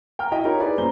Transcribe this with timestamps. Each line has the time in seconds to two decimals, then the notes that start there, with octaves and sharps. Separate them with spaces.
0.19 G5 A#5 F6
0.32 E4 F#4 D#5 E5 G5
0.44 D#4 F4 G4 A#4 C#5
0.59 D#4 E4 G4 G#4 B4 D5
0.78 F#2 A#2 C5 A#5 G7